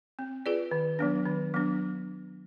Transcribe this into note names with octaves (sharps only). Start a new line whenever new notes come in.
C4
F4 G#4 B4 D5
D#3
F#3 B3 D4
D#3
F#3 B3 D4